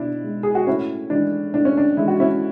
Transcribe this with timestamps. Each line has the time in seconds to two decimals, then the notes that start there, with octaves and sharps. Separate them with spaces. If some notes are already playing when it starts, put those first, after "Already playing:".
Already playing: B2 D4 E4
0.24 G#3
0.43 G#4
0.55 F#4
0.67 A2 C#4 E4
1.10 E3 G#3 D4
1.53 A2 D4
1.65 C#4
1.77 D4
1.97 E3 G#3 E4
2.08 F#4
2.20 C#4 E4